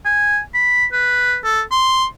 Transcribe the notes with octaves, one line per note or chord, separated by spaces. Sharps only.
G#5
B5
B4
A4
C6